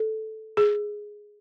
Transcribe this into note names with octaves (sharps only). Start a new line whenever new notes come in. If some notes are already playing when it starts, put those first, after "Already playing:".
Already playing: A4
G#4